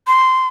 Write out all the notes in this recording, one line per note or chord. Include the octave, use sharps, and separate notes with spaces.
C6